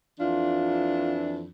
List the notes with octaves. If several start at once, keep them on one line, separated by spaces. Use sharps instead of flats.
F2 E3 D4 F4